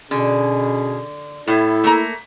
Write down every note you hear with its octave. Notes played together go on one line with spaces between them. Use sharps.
B2 D3 C#4 G#4
A2 E4 A4
A3 A#3 A#5